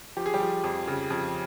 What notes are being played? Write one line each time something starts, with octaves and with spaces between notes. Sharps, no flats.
F3 G4
G#4
G3 G4
F3
F2
C#3
F2